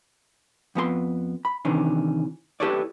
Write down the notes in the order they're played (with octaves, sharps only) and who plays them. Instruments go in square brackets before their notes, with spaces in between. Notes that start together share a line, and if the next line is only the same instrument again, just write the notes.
[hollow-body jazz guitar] F2 B3 G#4 C6
B5
C3 D#3 E3 C#4 D4
E4 G4 A4 B4 C#5 D5